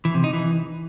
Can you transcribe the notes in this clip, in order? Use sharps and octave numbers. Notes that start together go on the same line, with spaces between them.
E3
C3
D#4
E3